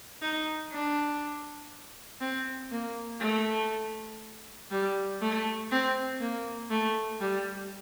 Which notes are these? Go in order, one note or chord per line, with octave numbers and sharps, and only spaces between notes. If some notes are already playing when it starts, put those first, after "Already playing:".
D#4
D4
C4
A#3
A3
G3
A3
C4
A#3
A3
G3